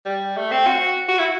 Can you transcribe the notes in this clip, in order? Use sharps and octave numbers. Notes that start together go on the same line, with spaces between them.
G3
A3
C4
F#4
F#4
E4